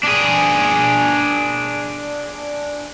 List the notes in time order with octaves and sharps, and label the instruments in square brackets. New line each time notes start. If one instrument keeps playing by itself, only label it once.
[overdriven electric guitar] D4 G#4